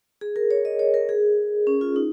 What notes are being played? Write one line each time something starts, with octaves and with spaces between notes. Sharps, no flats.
G#4
A#4
C#5
D#5
C#5
A#4
G#4
C#4
F4
D#4